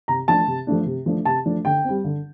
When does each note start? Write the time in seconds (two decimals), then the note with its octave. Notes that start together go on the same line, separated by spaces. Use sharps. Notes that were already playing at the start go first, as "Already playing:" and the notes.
0.08 C3 A#5
0.28 F3 A3 D4 A5
0.47 C3
0.67 F3 A3 D4
0.86 C3
1.06 F3 A3 D4
1.25 C3 A5
1.45 F3 A3 D4
1.65 D3 G5
1.84 G3 C4
2.04 D3